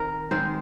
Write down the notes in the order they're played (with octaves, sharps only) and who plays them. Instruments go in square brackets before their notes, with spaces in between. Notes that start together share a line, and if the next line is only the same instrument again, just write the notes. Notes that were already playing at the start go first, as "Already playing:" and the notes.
Already playing: [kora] D#3 C4 A#4
D#3 G#3 C4 C5